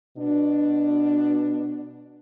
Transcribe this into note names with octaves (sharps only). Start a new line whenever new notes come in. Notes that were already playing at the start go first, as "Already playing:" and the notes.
B2 D4